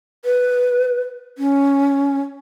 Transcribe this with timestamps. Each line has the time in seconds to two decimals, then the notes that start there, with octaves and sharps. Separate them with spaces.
0.25 B4
1.38 C#4